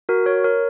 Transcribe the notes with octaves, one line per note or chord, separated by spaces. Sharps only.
F#4 A#4
A#4 C#5
A#4 C#5